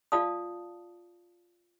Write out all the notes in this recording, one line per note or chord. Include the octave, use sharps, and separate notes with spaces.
F4 D5 F5 A5 D#6